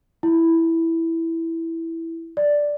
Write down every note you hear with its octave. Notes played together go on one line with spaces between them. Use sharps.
E4
D5